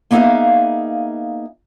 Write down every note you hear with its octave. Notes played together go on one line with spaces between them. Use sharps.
A#3 B3 D#4 G#4 E5 F5